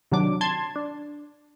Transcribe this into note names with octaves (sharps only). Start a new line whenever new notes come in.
C3 D#3 F#3 D4 D6
A5 C6 G#6
D4